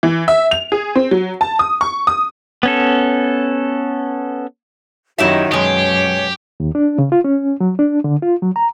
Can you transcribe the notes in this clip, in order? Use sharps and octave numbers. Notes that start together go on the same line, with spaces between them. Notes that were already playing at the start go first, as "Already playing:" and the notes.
E3
E5
F7
G#4
C4
F#3
A5
D#6
C#6
D#6
B3 C#4 A4
F#2 D#3 D#4 E4 F#4 G4 C#5 E5
F#2 B2 G#3 G4 C#5
D#2
D4
C#3
F4
C#4
F#3
D4
D3
F4
F#3
A#5